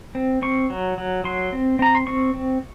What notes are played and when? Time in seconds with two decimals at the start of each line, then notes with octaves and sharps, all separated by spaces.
0.15 C4
0.42 C4 C#6
0.70 F#3
0.98 F#3
1.24 F#3 C6
1.53 C4
1.79 C4 A#5
1.95 C6
2.07 C4 C#6
2.34 C4